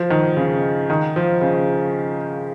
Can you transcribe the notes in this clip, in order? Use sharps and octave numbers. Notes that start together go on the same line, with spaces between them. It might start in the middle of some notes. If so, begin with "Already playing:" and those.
Already playing: F3
D#3
C#3
D#3
F3
C#3